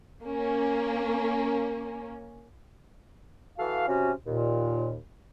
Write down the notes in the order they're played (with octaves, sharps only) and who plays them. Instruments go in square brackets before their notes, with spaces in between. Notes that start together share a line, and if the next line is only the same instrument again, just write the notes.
[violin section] A#3 C#4
[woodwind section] E3 F#4 A4 F5
C3 C#4 F#4
D#2 A#2